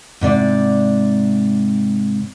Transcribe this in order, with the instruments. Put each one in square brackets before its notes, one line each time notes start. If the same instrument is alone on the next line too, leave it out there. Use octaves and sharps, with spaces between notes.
[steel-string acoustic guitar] G#2 C3 D5